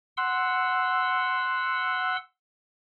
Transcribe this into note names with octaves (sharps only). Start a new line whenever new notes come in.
F#5 C6 E6